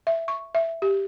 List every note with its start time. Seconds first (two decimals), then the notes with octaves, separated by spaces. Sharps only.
0.07 E5
0.28 C#6
0.55 E5
0.82 G4